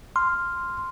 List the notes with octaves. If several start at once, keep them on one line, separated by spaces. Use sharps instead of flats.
C6 F6